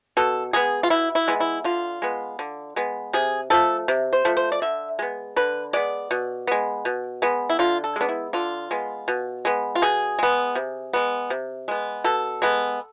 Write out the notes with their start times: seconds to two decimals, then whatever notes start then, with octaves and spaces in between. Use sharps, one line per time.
0.17 B2 A4
0.53 G#3 B3 G#4
0.83 F4
0.90 B2 E4
1.15 E4
1.28 G#3 B3
1.40 E4
1.64 D3 F4
2.02 G#3 B3
2.39 D3
2.76 G#3 B3
3.13 C3 G#4
3.50 F3 A3 A4
3.88 C3
4.13 C5
4.25 F3 A3
4.37 C5
4.52 D5
4.62 D3 E5
4.99 G#3 B3
5.36 D3 B4
5.73 G#3 B3 D5
6.11 B2
6.47 G#3 B3
6.85 B2
7.22 G#3 B3
7.50 E4
7.59 D3 F4
7.84 A4
7.96 G#3 B3 D4
8.09 E4
8.33 D3 F4
8.71 G#3 B3
9.08 B2
9.45 G#3 B3
9.75 F4
9.82 B2 G#4
10.19 G#3 B3
10.55 C3
10.93 G#3 B3
11.30 C3
11.68 G#3 B3
12.04 B2 A4
12.42 G#3 B3